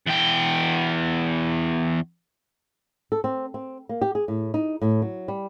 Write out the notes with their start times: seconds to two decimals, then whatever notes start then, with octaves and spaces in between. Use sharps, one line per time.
0.07 E2 G5
3.12 A4
3.24 C4
3.54 C4
3.89 A#3
4.02 G4
4.15 G#4
4.28 A2
4.54 D#4
4.82 A2
5.02 F#3
5.28 G3